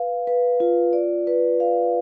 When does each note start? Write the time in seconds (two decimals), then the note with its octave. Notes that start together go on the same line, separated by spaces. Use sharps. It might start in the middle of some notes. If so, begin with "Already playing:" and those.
Already playing: B4 F5
0.27 B4
0.60 F4
0.93 D5
1.27 B4
1.60 F5